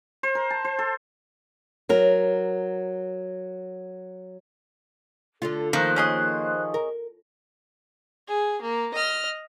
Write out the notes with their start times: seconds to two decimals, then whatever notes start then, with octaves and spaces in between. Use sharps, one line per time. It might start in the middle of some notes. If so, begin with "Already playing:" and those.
0.23 C5
0.35 A#4
0.50 A5
0.65 C5
0.79 A4
1.89 F#3 A#4
5.42 D3 D4 F4 A4
5.73 D#3 F3 A#3 C5 F#6
5.96 C#4 G#4 D#5
6.74 A#4
8.28 G#4
8.62 A#3
8.94 D#5 F6